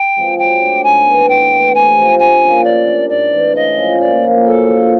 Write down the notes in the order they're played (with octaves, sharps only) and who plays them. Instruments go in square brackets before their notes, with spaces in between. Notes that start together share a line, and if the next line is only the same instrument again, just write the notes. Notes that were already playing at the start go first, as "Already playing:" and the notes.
Already playing: [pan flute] G5
[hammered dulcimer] F3 G#3 C4
[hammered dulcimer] F#3 [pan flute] G5
[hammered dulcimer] A3 D4
[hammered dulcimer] G#2 [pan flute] G#5
[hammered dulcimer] E3 G#3 B3
[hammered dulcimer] A2 [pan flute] G5
[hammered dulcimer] E3 A3
[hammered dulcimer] C3 [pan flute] G#5
[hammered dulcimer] F3 G#3 C4
[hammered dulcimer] D3 [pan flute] G#5
[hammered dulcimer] F3 A#3 C#4
[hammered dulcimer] A3 [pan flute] D5
[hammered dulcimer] D4 G4 A#4
[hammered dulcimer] G#2 [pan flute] D5
[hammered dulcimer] E3 A3 C4
[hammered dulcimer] C#3 [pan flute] D#5
[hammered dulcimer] F3 G#3 C#4
[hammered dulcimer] A#2 [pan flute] D5
[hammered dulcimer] F3 A#3 C#4
[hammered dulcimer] F#2 [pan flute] A4
[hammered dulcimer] D3 F3 A#3